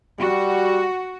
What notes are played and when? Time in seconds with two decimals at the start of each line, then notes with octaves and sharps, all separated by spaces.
0.19 G3 F#4